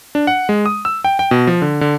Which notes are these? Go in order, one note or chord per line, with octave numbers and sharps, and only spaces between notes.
D4
F#5
G#3
D#6
E6
G5
G5
B2
F3
D3
D3